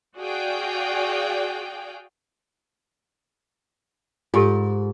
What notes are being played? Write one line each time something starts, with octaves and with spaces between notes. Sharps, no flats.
F#4 G#4 D5 F5 G5
G#2 F4 G4 A4